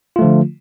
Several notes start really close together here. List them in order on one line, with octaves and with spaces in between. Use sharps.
F4 A3 F3 D3